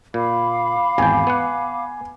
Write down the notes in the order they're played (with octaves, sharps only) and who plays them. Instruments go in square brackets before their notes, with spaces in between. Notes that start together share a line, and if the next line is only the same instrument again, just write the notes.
[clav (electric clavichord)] A#2 [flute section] F5 B5 D6
[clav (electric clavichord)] G#1 E2 G5 [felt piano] G#5
[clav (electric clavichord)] B3 F#5